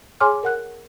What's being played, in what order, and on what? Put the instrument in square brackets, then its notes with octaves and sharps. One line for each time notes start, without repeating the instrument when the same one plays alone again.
[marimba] G#4 C#5 G#5 C6 D6 F6
A#4 F#5 F#6